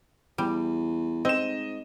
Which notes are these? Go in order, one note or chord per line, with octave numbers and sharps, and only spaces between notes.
E2 G3
G#2 C4 D#5 E7